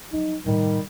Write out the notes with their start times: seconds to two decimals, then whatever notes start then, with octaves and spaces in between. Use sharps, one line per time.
0.12 F3 F#3 D#4
0.46 A2 C3 D#3 G3